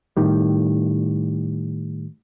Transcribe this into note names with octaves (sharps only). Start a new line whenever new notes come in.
A2 D#3 G3